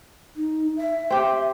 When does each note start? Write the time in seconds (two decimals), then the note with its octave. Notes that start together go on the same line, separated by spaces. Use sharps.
0.37 D#4
0.77 E5
1.10 C4 G4